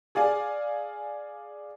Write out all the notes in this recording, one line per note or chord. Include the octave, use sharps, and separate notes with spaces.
G#4 D5 F5 G#5